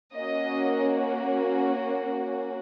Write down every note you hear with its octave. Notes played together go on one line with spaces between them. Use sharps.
A#3 C#4 F#4 D#5